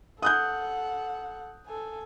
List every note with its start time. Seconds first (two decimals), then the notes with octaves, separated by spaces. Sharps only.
0.22 A4 F#5 D#6 F#6 G6
1.67 A4 G#5